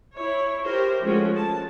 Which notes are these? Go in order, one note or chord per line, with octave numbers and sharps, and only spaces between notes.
E4 C#5
G4 A#4 C5
F3 G#3 A3 C#4 F#4
A5